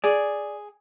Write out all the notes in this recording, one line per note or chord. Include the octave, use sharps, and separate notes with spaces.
G#4 D5